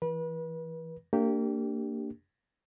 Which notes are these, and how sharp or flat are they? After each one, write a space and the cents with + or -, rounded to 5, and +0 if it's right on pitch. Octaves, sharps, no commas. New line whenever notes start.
E3 +0 B4 -35
A#3 -30 D4 +0 G4 -5